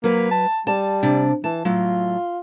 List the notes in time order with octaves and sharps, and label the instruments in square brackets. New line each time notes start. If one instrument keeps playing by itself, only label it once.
[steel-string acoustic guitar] F#3 B4 [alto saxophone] A#3
[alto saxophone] A5
[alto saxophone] G3 [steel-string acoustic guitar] A5
[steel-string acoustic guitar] C3 D4
[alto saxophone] E3 [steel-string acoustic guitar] A5
[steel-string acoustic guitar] A2 F#3 [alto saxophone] F4